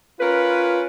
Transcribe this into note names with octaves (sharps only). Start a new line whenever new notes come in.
C#4 F4 A#4 B4